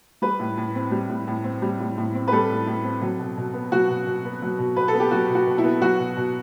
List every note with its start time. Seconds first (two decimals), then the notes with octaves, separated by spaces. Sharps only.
0.22 G3 B4
0.39 A2
0.57 A2
0.75 C4
0.91 G3
1.09 A2
1.27 A2
1.44 C4
1.62 G3
1.80 A2
1.98 A2
2.14 C4
2.28 B4
2.32 G3 A4
2.49 A2
2.67 A2
2.84 C4
3.02 F#3
3.19 B2
3.37 B2
3.54 B3
3.72 F#3 F#4
3.90 B2
4.06 B2
4.25 B3
4.42 F#3
4.58 B2
4.76 B2 B4
4.88 A4
4.94 B3
5.00 G4
5.11 F#3 F#4
5.29 B2
5.35 F#4
5.46 B2
5.58 E4
5.64 B3
5.81 F#3 F#4
5.99 B2
6.17 B2